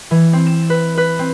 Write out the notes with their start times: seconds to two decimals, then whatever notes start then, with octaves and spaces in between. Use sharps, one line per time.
0.11 E3
0.33 C4
0.47 E7
0.70 B4
0.98 B4
1.19 C4